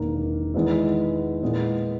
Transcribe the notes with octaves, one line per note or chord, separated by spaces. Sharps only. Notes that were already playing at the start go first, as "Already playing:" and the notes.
Already playing: E1 E2 D#3 A#3
E2 D#3 G#3 B3 E4
A#2 G#3 B3 E4